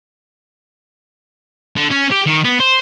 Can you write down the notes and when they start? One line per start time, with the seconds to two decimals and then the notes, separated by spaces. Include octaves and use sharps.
1.76 D3
1.91 C#4
2.12 G4
2.27 D#3
2.45 B3
2.60 C5